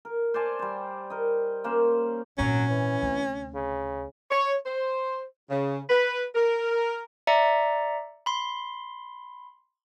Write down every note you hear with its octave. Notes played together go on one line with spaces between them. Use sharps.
A#4
C5 D5 G#5 A5
G3 C5
A#4 D#5
A#3 C#4 C5
G#1 A#2 F#3 C#4
E3
D2 C3
C#3
C#5
C5
C#3
B4
A#4
D5 E5 A#5 C#7
B5 C6